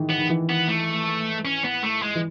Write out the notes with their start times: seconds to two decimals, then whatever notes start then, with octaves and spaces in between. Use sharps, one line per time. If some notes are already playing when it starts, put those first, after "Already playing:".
Already playing: G#2 D#3 E3
0.10 B3
0.18 D#3
0.30 E3
0.49 B3
0.68 A3
1.45 C#4
1.64 B3
1.83 A3
2.02 G#3
2.15 E3